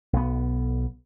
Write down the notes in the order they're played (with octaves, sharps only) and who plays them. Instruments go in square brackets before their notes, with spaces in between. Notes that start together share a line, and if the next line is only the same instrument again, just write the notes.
[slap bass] B1 B3